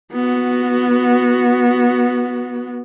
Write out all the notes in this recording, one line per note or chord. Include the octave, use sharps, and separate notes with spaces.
B3 F#4